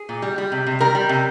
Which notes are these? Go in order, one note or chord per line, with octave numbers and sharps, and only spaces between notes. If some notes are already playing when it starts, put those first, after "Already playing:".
Already playing: G#4
A#2
G3
G3
C3
C3
G3 A#4
G3
C3